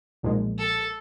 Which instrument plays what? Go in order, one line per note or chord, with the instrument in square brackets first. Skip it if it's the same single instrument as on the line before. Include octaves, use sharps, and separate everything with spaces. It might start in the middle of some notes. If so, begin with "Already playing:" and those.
[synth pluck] B1 A#2 F3 G#3
[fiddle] A4